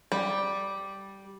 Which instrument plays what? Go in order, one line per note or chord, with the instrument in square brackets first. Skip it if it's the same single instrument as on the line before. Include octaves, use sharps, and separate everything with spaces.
[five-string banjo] G3